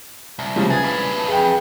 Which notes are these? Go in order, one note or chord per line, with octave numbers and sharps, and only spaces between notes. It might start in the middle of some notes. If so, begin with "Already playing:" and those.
C2
C#3 F3 G3 G#3 A#3
G#4 B4 G#6 A6
D4 E4
F2 G#4 G5